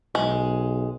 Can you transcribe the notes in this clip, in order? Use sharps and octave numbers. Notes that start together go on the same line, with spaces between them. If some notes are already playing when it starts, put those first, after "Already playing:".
B1 G#3